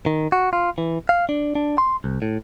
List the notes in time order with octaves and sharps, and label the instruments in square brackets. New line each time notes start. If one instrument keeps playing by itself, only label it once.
[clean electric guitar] D#3
F#4
F4
E3
F5
D4
D4
C6
C2
A2